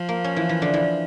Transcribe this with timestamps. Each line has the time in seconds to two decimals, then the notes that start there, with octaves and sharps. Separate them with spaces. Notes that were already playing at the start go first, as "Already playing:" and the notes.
Already playing: F3
0.09 A#3
0.24 C#4
0.36 E3
0.49 E3
0.62 D3
0.74 E3